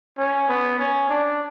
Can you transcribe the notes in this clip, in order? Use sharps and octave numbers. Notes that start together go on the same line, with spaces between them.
C#4
B3
C#4
D4